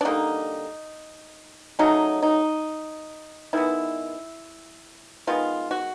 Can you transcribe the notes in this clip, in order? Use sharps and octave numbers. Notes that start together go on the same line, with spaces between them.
D4
D3 G3 A#3 D#4
C#3 F#3 A3 D#4
D#4
D#3 G#3 B3 E4
D#3 G#3 B3 F4
F#4